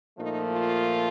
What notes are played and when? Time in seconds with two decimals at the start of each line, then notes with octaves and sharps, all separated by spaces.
0.18 A#2 F3 A3 D#4
0.50 F4